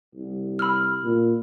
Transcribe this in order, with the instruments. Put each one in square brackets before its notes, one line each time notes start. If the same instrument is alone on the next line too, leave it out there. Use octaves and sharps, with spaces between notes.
[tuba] C2
[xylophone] B5 E6 F6
[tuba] A#2